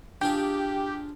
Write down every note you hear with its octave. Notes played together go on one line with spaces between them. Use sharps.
D4 F4 G4 G#4